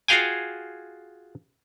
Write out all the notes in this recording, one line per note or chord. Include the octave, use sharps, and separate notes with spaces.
F4 F#4 G#4 F5 G5 G#5